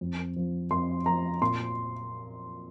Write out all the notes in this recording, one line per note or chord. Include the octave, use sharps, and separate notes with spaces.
F2
F3
F2 C6
F3 A#5
A#2 C6